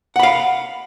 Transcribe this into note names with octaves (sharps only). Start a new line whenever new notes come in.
F5 F#5 B5